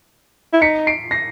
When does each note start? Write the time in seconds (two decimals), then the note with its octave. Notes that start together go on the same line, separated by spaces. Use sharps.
0.53 E4
0.61 D#4 B6 C#7
0.87 C7 D7
1.11 A#6 C7